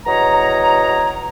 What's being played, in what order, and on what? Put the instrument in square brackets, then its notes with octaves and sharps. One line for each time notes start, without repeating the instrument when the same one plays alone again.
[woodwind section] E2 F#4 C#5 D#5 A#5